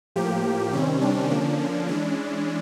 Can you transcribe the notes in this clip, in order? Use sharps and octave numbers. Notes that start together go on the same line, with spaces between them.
A2 F3 A#3 G4
C3 D#3 G3 C4 C#4
D4
D3 F3 A#3 C#4
D4
E3 G#3 C#4 D4